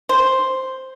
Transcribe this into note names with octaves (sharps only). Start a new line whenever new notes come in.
C5